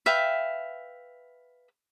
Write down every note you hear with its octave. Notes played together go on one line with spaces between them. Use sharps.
B4 E5 F5 G5